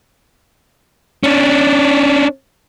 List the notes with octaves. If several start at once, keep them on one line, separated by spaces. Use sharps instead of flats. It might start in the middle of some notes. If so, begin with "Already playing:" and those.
C#4 D4